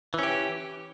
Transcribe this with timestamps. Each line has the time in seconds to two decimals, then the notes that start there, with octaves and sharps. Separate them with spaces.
0.14 E3
0.19 C#4
0.23 G4